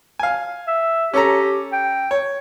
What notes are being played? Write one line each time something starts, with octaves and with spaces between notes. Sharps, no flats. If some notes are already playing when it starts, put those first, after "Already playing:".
F5 G#5
E5
C#4 G4 A4 A#5
G5
C#5